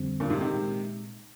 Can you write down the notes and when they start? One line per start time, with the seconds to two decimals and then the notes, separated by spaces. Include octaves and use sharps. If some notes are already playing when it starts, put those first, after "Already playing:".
Already playing: F2 D3 G3 C4
0.20 G2 A#2
0.30 G#2 C3
0.41 C3 D#3
0.54 A#2 G#3